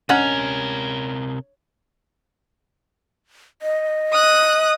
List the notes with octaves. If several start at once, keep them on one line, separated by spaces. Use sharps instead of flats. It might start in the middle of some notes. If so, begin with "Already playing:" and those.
C3 C#4 A#4 D#5 F#5
D#5
D#6 F#6